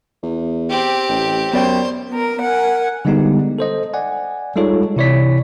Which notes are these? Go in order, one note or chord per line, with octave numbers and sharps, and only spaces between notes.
E2
C4 G4
A1
F#2 B3 C5 D5 G5
B3 A#4
A#4 F#5 G#5
D3 G3 G#3 B3 D#4 G4
A4 C5 D#5
D5 F#5 G#5
G3 G#3 D#4 F4 A4 C#5
C3 E3 E4 C#5 D5 B6